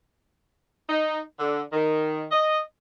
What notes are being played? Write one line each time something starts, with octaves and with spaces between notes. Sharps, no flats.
D#4
D3
D#3
D#5